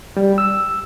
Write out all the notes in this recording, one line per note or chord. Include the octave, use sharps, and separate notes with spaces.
G3
E6